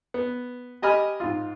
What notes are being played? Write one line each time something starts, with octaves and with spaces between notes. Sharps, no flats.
B3
G4 D#5 G#5 B5 F6
G#2 F4